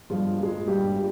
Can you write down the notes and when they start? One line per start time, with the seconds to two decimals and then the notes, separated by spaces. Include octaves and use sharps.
0.10 G2 F3 G#3 F4
0.39 A#2 G#3
0.67 G2 G3 G4
0.96 A#2